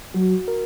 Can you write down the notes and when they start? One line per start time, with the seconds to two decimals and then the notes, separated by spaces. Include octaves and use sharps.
0.14 F#3 F#4
0.48 A#4